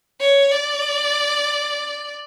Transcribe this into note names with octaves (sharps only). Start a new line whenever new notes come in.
C#5
D5